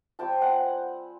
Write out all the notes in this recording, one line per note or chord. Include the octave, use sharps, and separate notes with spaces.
G3 C4 F4 G5 A5
F#5 G#5